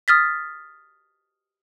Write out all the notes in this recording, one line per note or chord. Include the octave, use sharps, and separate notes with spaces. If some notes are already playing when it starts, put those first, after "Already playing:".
D#6 F6 A6 B6